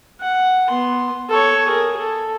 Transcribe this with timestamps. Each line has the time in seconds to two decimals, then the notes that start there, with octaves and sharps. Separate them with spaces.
0.21 F#5
0.68 B3 C6
1.29 A4 C#5
1.67 G#4 A#4
1.98 A4